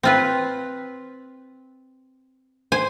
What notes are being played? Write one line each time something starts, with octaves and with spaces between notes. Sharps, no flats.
C4 F4 B4
C5 G#5